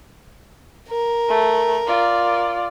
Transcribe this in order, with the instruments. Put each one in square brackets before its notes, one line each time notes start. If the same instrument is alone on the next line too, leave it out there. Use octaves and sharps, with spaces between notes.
[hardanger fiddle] A#4
[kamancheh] A3
F4 D5